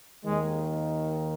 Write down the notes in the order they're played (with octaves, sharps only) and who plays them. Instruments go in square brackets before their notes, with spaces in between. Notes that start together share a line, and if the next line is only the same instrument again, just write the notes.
[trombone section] D#2 D#3 G#3